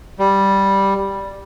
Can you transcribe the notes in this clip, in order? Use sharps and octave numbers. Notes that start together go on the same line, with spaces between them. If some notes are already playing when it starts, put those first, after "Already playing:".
G3